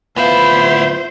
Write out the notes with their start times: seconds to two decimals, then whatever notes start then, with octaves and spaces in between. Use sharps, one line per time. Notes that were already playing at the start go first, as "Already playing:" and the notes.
0.16 D2 B3 E4 F4 B4 C5